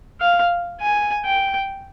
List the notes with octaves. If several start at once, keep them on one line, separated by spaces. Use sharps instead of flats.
F5
G#5
G5